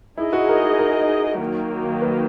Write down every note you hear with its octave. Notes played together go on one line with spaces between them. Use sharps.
D#4 E4 G#4 D#5
F#4
A#4
A#4
D#3 F#3 A#3
B4